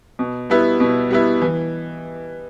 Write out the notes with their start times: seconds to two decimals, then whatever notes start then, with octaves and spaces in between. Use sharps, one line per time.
0.19 B2
0.50 G3 B3 E4
0.80 B2
1.10 G3 B3 E4
1.42 E3